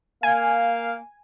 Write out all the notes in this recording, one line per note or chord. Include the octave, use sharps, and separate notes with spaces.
A#3 F5 G#5